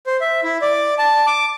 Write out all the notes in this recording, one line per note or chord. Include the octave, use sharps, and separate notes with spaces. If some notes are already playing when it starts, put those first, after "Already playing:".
C5
E5
E4
D5
A5
D6